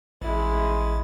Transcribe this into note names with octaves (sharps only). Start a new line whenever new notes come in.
A1 G#3 E4